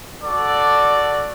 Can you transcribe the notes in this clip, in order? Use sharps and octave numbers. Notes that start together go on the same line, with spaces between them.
F#4 A4 D5